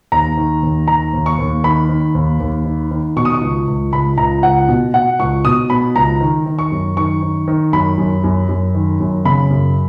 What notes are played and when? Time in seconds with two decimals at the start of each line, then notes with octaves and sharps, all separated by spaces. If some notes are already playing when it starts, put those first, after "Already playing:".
0.12 D#2 A#5
0.37 D#3
0.63 D#2
0.88 D#3 A#5
1.13 D#2
1.26 C#6
1.38 D#2
1.64 D#3 B5
1.89 D#3
2.15 D#2
2.40 D#2
2.65 D#3
2.91 D#3
3.16 B2 C#6
3.25 D#6
3.34 C#6
3.42 C#2
3.67 C#2
3.92 C#2 B5
4.17 C#2 A#5
4.43 C#2 F#5
4.69 B2
4.94 B2 F#5
5.19 C#2 C#6
5.45 B2 D#6
5.70 B2 B5
5.96 C#2 A#5
6.21 D#3
6.46 D#3
6.59 C#6
6.72 F#2
6.97 D#3 C#6
7.22 D#3
7.48 D#3
7.73 F#2 B5
7.98 F#2
8.24 F#2
8.49 F#2
8.74 D#3
9.00 F#2
9.25 C#3 B5
9.50 F#2